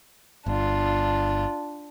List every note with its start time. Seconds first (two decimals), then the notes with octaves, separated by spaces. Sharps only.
0.46 G1 D4 F4